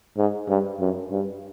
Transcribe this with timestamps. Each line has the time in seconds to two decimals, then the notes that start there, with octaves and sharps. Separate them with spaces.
0.17 G#2
0.48 G2
0.80 F#2
1.11 G2